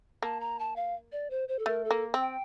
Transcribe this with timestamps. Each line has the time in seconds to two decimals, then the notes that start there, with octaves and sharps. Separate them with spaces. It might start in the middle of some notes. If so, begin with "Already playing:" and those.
0.22 A#3 A5
0.40 A#5
0.59 A5
0.76 F5
1.12 D5
1.30 C5
1.48 C5
1.59 A4
1.66 A3 A#4
1.85 A4
1.91 A#3
2.14 C4
2.21 G5